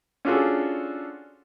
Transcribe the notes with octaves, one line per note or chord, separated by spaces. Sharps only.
C#4 D4 F4 F#4 G#4 A4